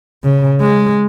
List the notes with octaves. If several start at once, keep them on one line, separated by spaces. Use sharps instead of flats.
C#3
G#3